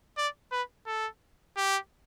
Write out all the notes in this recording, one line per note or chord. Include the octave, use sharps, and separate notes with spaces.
D5
B4
A4
G4